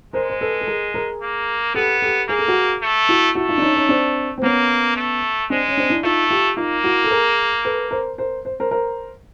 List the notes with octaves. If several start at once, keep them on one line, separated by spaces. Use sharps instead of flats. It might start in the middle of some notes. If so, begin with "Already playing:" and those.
G#3 A#4 C5
C5
A4 B4
A4
G#4 A#4
G#4 A#4
A#3
B3 G4 A4
G4 A4
A#3 G#4
A4
F#4 G#4
A3
E4 F#4
A3 E4 F#4
D#4 F4
D4
C#4 D#4
C#4 D#4
C4 D4
C4
A#3 B3 C#4
A3
G#3 C4 D4
C#4
C4 D4
D4 E4
A3 D#4 F4
F4 G4
A#3 D#4 F4
E4 F#4
A4
G#4 A#4
A4 B4
A#4 C5
A#4 C5
C5
A#4 C5
A#4 C5